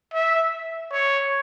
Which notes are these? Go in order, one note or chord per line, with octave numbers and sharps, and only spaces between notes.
E5
C#5